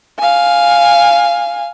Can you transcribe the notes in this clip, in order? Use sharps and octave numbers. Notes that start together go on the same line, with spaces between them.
F5 G#5